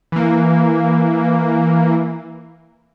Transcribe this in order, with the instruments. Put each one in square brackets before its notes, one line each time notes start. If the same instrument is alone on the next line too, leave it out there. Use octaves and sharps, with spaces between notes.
[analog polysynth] E3 A#3